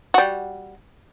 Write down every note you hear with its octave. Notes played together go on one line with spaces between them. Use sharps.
G3 F#4